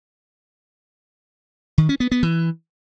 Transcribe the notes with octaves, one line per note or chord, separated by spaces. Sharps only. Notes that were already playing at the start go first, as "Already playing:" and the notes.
D#3
C#4
B3
B3
E3